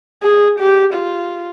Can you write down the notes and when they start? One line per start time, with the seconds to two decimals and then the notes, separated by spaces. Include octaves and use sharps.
0.23 G#4
0.59 G4
0.94 F4